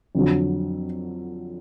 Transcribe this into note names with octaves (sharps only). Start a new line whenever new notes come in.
F2 D3 F#3